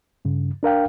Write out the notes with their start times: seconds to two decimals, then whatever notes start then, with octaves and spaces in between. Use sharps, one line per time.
0.25 G2 C#3
0.63 D4 A#4 F5 G5